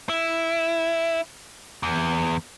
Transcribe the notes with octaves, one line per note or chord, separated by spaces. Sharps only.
E4
E2